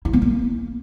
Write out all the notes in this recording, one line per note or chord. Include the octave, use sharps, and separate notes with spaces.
E4
B3
A#3